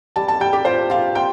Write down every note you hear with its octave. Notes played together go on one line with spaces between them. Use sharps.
G3 A5
A5
G3 G5
G4
F4 C5
F4 F5
C5 G5